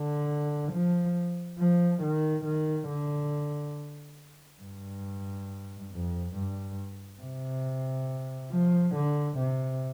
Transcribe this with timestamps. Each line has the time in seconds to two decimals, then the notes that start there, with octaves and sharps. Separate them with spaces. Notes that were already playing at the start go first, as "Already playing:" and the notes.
Already playing: D3
0.72 F3
1.58 F3
2.02 D#3
2.44 D#3
2.88 D3
4.61 G2
5.92 F2
6.35 G2
7.22 C3
8.51 F3
8.95 D3
9.38 C3